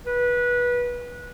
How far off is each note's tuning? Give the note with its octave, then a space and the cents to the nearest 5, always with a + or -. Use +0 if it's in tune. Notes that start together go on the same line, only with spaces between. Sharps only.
B4 -20